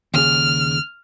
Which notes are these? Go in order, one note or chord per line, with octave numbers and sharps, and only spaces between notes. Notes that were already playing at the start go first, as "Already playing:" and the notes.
D#2 C#3 G#4 F6